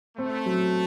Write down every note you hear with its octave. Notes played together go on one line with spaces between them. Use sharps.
A3 C4
F#3